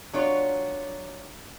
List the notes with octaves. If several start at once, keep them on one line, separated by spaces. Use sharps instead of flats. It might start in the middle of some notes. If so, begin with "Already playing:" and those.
F#3 D4 F4 C#5